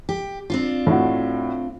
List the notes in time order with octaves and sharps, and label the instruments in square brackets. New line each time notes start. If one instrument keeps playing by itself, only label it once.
[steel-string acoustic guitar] G4
C4 D4 F4
[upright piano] A2 F#4